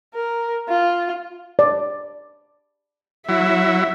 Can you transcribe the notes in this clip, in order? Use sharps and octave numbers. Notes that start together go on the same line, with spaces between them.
A#4
F4
D5
F#3 E4 E5